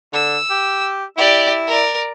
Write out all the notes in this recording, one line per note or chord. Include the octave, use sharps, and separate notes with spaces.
D3 E6
G4
E4 G4 D5
A#4 D5